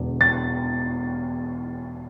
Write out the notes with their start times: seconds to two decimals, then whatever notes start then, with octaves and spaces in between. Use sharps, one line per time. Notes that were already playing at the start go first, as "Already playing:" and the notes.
Already playing: E1 E2 D3
0.21 A6